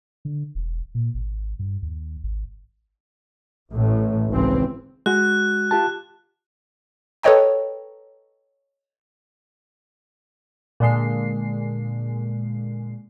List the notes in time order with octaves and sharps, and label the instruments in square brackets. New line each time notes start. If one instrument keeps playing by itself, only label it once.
[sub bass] D3
E1
A#2
G#1
G2
D#2
G#1
[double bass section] A1 A2
G#1 C#2 E3 C4
[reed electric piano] G#3 F#4 [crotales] F#6
[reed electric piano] F4 G4 A5
[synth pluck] A4 B4 C#5 D#5 G5 A#5
[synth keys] A#2 D3 G#3 C7